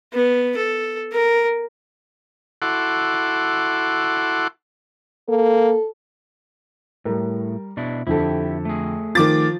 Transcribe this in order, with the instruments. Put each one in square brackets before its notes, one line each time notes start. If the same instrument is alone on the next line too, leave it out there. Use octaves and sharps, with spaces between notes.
[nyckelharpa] B3
A4
A#4
[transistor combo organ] E4 F#4 A4 F#5 C6 D6
[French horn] A#3 [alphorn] A4
[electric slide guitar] A2 [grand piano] G3 A#4
[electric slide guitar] B2 D4 E4
[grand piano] F2 D3 A4 [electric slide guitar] E4 G4
[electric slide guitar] A3 G#4
[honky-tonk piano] D#3 D6 A6 [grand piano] F3